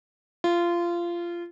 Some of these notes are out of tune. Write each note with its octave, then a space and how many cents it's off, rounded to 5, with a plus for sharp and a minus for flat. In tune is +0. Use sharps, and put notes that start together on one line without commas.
F4 -20